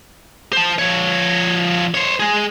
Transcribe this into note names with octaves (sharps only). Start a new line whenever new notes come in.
C5 A5
F3 C#5
C5 C#5
G#3 G#4